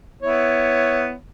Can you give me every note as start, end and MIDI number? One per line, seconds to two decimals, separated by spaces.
0.22 1.13 59
0.22 1.13 64
0.22 1.13 73